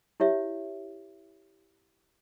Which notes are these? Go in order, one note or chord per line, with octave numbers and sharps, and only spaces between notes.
E4 G4 C#5 E5